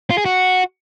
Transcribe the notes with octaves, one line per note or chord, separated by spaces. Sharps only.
F4
G#4
F#4